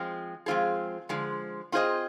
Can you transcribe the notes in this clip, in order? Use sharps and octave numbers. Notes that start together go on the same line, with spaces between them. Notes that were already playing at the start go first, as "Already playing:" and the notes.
Already playing: F3 G#3 C4
F3 G#3 C4 F4 G#4
D3 F3 G#3
C4 F4 G#4 C5 D#5